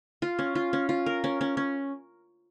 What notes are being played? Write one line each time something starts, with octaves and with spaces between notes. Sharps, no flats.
F4
C#4
F4
C#4
F4
A#4
C#4
C#4
C#4